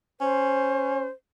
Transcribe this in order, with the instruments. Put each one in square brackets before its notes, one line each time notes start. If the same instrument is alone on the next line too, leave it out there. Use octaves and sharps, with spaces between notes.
[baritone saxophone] C#4 [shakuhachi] C5